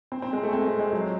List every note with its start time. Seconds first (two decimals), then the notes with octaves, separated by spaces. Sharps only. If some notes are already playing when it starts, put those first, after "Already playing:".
0.12 C4
0.22 C4
0.33 G#3
0.43 A3
0.53 C4
0.66 G#3
0.79 G#3
0.93 F#3